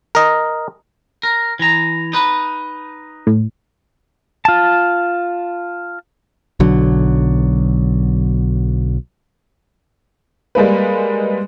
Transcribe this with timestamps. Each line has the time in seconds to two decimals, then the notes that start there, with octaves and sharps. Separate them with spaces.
0.15 A#4 D#5
1.23 A#4
1.59 E3 A#5
2.13 D#4 B4
3.27 A2
4.45 F4 A5
6.60 B1 D3 F#3
10.55 G3 G#3 A#3 B4